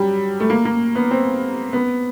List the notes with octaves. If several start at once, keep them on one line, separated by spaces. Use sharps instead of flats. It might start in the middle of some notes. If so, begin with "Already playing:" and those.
Already playing: F#3 G3
A3
A#3
A#3
B3
C4
B3